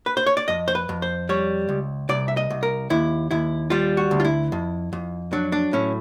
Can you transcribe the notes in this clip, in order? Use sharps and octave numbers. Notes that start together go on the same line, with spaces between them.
B4
C5
C#5
D5
F2 D#5
C5
B4
F2
C5
G3 C#5
C#2
C2 D5
E5
D#5
C2
A#4
D#2 E4
D#2 E4
G3 F4
F#4
D2
F4
E4
F2
F2
F#3 D4
D4
A2 C#4